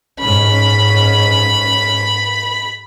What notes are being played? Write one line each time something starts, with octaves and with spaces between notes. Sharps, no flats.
G#2 C#4 B5